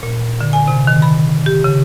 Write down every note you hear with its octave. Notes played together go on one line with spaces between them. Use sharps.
A#2
D3
G#5
C3
D#3
B5
G4
C#3